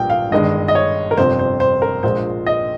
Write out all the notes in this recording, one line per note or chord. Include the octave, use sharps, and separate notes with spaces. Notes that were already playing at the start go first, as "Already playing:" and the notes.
Already playing: A#1 A#2 G3 G5
F5
G1 G2 D#3 G#3 D#5
D#5
C#5
A#4
G1 F2 C3 C5
C5
C5
A#4
A#1 A#2 G#3 C5
D#5